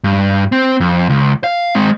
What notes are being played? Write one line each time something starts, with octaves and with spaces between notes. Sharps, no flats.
G2
C4
F2
C#2
F5
G#3 C4